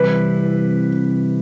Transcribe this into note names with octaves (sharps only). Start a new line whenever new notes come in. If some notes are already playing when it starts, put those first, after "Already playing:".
Already playing: C3 E3 G3 C4 E4 B4